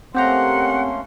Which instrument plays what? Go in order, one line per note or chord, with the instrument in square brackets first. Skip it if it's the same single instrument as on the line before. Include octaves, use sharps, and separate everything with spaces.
[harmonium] A3 A#3 C#4 [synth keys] C4 G4 A#5 [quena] F#5 [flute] C6